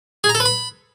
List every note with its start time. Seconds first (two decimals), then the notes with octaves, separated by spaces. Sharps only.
0.24 G#4
0.29 A#5
0.35 A4
0.40 B4
0.45 B5